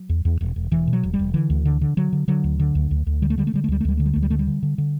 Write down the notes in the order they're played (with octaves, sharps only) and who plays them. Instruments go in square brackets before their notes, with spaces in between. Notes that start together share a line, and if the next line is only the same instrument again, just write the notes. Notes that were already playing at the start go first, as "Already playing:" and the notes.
Already playing: [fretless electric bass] F#3
E2
E2
E1
E1
E1 E3
B2
F#3
E1
G3
E1
D3 E3
D2
D3
D3
D3 F#3
D3
D3 F#3
D2
D3
D2
D2
D2
D3 G3
A3
D3 G3
A3
D3 G3
A3
D2 G3
A3
D2 G3
D3 A3
G3
D2 A3
G3
D3 A3
G3
D3
D3
D3